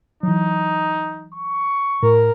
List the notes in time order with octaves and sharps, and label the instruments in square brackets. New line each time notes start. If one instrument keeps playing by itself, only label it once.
[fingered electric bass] E3 F#3 [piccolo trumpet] D#4
[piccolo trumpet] C#6
[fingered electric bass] A2 [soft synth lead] A#4